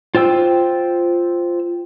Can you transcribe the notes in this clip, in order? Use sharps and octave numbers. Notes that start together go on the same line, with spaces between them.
F4 C5 G5 E6